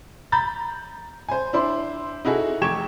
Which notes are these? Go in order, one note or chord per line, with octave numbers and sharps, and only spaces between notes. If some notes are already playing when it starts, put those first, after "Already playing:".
A#5 B5 G6 A6
C5 G#5
D4 E4 C5 C6
D#4 E4 F#4 G#4 A4
F1 G4 G5 C#6 G#6 E7